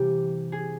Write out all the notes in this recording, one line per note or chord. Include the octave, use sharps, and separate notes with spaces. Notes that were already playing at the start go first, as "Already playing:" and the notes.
Already playing: C3 E3 G3 G4
G#4